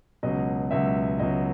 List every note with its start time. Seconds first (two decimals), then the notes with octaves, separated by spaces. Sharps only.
0.23 C#2 B2 F#3 D#5
0.71 C#2 B2 F#3 E5
1.19 C#2 B2 F#3 D#5